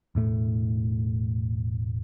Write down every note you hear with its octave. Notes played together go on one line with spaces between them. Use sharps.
E1 A2 A3